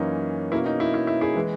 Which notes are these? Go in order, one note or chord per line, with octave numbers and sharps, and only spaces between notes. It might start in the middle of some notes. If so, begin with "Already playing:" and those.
Already playing: F#2 E3 A#3 C#4 D#4
B2 A#3 C#4 E4
D#4
E4
E4
E4
E4 G#4
E3 G#3